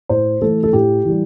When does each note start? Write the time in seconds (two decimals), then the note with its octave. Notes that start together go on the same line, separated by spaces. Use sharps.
0.09 A2 C5
0.42 E3 A3 A4
0.63 A4
0.73 A2 G4
1.05 E3 G3